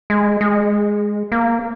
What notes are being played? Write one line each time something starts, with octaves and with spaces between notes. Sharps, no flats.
G#3
G#3
A#3